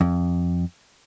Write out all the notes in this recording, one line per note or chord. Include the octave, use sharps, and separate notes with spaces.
F2